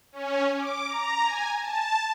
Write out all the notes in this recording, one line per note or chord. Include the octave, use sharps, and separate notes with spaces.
C#4
D6
A#5
G#5
A5